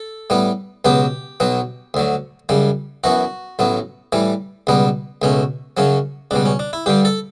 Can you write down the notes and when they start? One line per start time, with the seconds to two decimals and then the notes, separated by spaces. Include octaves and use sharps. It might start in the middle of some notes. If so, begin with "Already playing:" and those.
Already playing: A4
0.30 A2 G3 B3
0.85 C#2 B2 F#3 B3 G4
1.40 B1 B2 F#3 B3
1.94 D2 D3 F#3
2.49 F#2 C#3 G3
3.04 F#2 E3 B3 F#4
3.59 A1 A2 F#3 B3
4.12 A2 E3 G3
4.67 C#2 B2 G3 B3
5.22 C#2 B2 A3 C#4
5.77 F#2 C#3 F#3 C#4
6.31 C#2 B2 G3 D4
6.46 C#4
6.59 D4
6.73 E4
6.86 G2 D3 G3 G4
7.05 A4